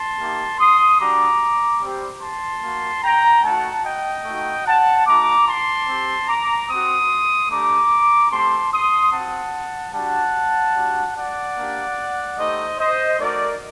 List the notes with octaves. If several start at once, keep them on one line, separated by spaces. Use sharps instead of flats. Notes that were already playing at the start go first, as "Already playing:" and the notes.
Already playing: A5 C6
A#3 D#4 G4
C6 D#6
G3 D4 F#4 A#5 D6
G3 C4 G4
A5 C6
A#3 F#4
G5 A#5
A3 D#4 F#4 F#5 A5
D#5 G5
A3 D#4 F#4
F#5 A5
A3 D#4 F#4 A#5 D6
A5 C6
C4 G4
A#5 D6
C4 F#4 C6 D#6
A3 D4 G4 A#5 D6
A3 C4 G4 A5 C6
C6 D#6
C4 F#4 F#5 A5
G3 D4 F#4 F#5 A5
G3 D4 F#4
D5 F#5
A#3 D4 G4
A3 D#4 G4 C5 D#5
C5 D#5
A3 D#4 F#4 A#4 D5